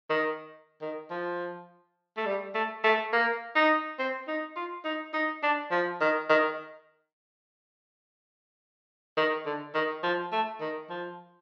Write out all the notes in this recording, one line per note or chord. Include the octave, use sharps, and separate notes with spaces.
D#3
D#3
F3
A3
G3
A3
A3
A#3
D#4
C4
D#4
F4
D#4
D#4
D4
F3
D#3
D#3
D#3
D3
D#3
F3
A3
D#3
F3